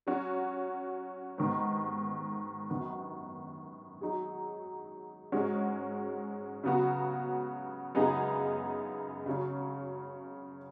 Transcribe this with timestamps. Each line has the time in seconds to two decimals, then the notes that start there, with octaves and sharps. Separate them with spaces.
0.07 F#3 C#4 F#4
1.38 G#2 D#3 B3
2.70 F#2 D#3 B3
4.01 F#3 D#4 G#4
5.32 G#2 G#3 C#4 F#4
6.64 C#3 F#3 B3 F#4
7.95 F#2 C#3 B3 D#4 G#4
9.26 C#3 F#3 C#4